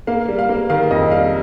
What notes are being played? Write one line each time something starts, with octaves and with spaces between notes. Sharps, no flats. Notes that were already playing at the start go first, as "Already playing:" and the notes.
A#3 F5
G3
F5
A#3
D#3 F5
F2 D#5
G3 F5